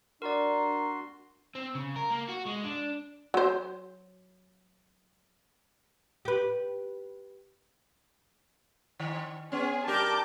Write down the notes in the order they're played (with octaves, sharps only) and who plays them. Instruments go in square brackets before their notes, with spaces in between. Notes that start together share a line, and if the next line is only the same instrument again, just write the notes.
[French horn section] D4 [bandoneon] F#4 C6 [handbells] A#4 D5 [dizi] A#5
[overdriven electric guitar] C4
C#3
A#4
A#3
F#4
G#3
D4
[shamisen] F#3 C5
[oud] G4 B4
[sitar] D#3
[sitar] B3 C#4 [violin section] G#4
[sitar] G2 G4 A#4 [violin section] A5 D6 G6